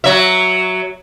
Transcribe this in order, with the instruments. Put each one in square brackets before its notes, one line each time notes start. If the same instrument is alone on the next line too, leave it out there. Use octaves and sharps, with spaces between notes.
[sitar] F#3 E5